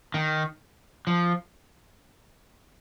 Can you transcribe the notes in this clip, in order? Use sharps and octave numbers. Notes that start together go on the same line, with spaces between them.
D#3
F3